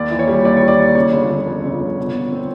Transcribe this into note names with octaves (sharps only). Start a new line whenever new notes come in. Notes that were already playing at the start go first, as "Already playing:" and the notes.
Already playing: D#2 D5
E3
C#5
G3
D#2 D5
G3 C#5
D5
D#2
C#3 C#5
G1
G1
F2
C#3
G1
B2
B2
C4